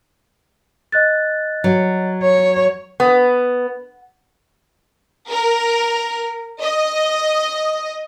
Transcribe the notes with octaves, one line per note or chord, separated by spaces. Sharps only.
D#5 F#6 A6
F#3
C#5
B3
A#4
D#5